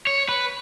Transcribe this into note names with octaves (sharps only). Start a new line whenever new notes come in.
C#5
B4